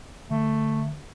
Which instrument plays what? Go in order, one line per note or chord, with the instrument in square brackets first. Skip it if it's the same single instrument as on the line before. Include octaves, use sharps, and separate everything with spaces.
[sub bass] D3 [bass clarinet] A3